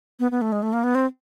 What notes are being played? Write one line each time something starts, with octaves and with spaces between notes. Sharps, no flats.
B3
B3
A3
G#3
A3
A#3
B3
C4